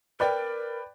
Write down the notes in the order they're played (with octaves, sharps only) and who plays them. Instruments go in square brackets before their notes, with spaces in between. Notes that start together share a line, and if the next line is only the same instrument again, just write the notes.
[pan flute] A#4 [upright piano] B4 D5 G5